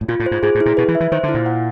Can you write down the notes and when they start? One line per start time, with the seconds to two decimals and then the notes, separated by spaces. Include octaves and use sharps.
0.01 A2
0.08 A#2 F4
0.20 A2
0.26 C5
0.31 G#2
0.43 G#2 G#4
0.55 A2
0.60 E4
0.66 A#2
0.77 B2 B4
0.88 E3
0.95 E5
1.00 E3
1.12 D#3 C5
1.23 D3
1.29 E4
1.34 A#2
1.46 F#5